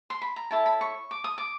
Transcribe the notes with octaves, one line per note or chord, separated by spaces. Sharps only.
C6
B5
A#5
E4 A4 C#5 A5
B5
C#6
D6
D#6
D6